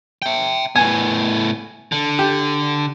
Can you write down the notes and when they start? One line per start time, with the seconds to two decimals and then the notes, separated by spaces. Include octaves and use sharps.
0.22 E5 G5
0.76 A2 B3 G#5
1.92 D3
2.19 G4